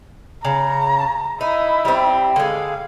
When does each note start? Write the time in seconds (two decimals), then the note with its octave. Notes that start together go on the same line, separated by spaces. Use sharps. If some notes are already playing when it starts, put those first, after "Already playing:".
0.45 C#3 A#5
1.41 D#4 E4
1.85 G3 C4
2.36 D3 G#3 F5